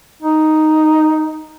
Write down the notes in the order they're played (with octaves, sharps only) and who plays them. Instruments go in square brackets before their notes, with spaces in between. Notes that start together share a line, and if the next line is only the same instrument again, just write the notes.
[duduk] D#4